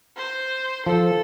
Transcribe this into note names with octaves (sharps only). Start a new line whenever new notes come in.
C5
F3 A4